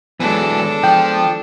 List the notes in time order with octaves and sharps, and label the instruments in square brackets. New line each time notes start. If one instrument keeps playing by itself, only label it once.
[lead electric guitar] E3 F#3 [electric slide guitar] G#3 B3 [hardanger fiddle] D4 A4
[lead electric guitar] F3 [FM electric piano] G5